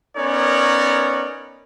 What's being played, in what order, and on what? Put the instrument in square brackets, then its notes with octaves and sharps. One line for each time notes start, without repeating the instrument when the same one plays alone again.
[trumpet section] B3 C#4 D#4 A#4 C#5 D5